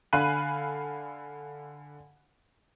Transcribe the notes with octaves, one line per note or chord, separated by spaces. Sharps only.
D3 F5 G#5 B5 F#6 D#7